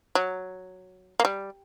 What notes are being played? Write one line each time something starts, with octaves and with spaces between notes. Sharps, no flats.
F#3
A#3
G3